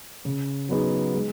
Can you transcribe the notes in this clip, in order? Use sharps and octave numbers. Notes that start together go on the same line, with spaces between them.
C#3
F#3 B3 D#4 G#4
G#3